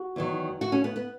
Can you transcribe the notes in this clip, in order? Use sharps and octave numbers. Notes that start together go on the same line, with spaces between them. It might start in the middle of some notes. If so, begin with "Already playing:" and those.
Already playing: F#4
E2 D#3 F#3
F#4
C#4
B3
B3